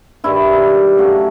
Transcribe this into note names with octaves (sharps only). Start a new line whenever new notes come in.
G2 D#3 G3 E4
C#3 F#3 A3